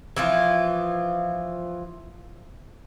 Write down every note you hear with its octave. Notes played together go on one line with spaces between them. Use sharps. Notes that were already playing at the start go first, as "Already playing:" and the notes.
E3 F3 F4